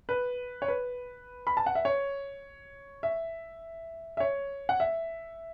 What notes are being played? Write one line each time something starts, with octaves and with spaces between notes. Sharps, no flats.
B4
C#5
B4
B5
A5
F#5
E5
C#5
E5
E5
C#5
F#5
E5